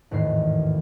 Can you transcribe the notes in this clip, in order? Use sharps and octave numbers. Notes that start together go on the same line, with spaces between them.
G#1 E2 A2 D#3 C7